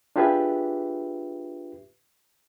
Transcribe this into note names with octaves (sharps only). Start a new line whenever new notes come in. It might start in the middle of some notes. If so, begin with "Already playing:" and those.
D4 F4 G4 G#4 B4 E5